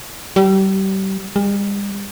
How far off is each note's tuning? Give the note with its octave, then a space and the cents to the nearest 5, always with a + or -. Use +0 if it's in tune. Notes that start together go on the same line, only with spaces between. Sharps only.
G3 -30
G3 +45